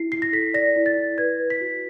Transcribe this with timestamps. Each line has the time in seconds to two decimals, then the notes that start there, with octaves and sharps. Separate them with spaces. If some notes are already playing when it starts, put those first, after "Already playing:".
Already playing: E4 C7
0.12 E4 C7
0.22 A#6
0.33 A4 B6
0.54 D5 A#6
0.76 E4
0.86 A6
0.97 E4
1.18 B4 G#6
1.39 B4
1.50 B6
1.61 F#4